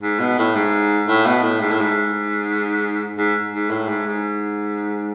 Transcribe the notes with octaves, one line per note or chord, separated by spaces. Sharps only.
G#2
B2
A2
G#2
A2
B2
A2
G#2
A2
G#2
G#2
G#2
A2
G#2
G#2